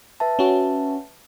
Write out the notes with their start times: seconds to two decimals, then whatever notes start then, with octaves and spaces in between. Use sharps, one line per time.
0.20 B4 E5 A5
0.39 C#4 F#4